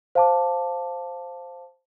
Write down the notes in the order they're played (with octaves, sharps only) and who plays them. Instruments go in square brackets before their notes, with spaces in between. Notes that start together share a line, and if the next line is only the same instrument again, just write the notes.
[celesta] C5 F5 A5 D6